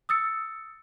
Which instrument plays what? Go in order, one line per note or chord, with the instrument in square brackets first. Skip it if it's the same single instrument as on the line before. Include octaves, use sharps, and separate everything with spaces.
[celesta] D#6 E6 A6 C#7